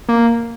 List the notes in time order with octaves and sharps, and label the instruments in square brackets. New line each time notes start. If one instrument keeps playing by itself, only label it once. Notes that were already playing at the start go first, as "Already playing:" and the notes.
[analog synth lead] A#3